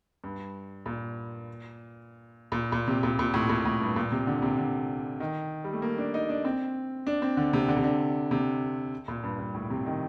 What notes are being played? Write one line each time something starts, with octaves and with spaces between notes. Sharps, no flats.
G2
A#2
A#2
A#2
C3
A#2
A#2
A2
A#2
A2
G2
A#2
C3
D3
C3
D3
D#3
G3
A3
A#3
D4
D#4
D4
C4
D4
C4
D3
C3
D3
C3
D3
C3
A#2
G2
G2
A2
C3
D#3